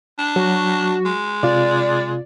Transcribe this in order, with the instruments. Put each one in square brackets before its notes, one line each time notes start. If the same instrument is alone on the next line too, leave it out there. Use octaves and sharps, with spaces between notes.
[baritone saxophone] D4
[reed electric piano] F#3 [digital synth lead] F#4
[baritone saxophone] G#3
[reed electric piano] C3 F4 [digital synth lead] D5